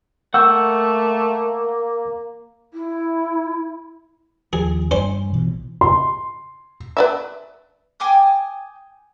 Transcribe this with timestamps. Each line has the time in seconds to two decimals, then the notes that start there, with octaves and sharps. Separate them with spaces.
0.34 A3 A#3 F#5 C#6 E6 G6
2.73 E4
4.53 D#2 F3 G#4
4.91 G2 C#4 C5
5.33 A#1 B2 E3
5.81 C6
6.97 B4 D5 E5
8.00 G5 G#5 D6 D#6